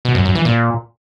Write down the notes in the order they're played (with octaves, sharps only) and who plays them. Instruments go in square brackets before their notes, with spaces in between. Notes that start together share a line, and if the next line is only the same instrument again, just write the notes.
[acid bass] B2
F#2
F#2
E3
A#2